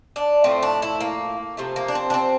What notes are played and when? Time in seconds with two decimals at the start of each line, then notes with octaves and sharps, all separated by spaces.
0.16 D4
0.44 A2 F3 A3 C4
0.63 D4
0.82 E4
1.00 A#3
1.57 C3 F3 A3
1.76 A#3
1.88 D4
1.95 C4
2.10 D4
2.14 C4